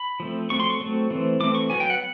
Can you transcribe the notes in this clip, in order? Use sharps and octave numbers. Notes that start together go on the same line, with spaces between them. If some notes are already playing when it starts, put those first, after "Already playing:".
Already playing: B5
F3 A3 C4
F#3 A3 C4 C#6
C6
C#6
F#3 A3 C4
E3 A3 C4
E3 A3 C4 D6
C#6
F#3 B3 G#5
G5
F#5